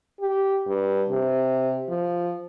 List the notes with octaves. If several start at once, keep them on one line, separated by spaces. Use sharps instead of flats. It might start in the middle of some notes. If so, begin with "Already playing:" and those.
G4
G2
C3
F3